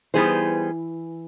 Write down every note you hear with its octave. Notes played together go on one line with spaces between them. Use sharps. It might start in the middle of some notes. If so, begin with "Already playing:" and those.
E3 G3 B3 D#4 G#4 C5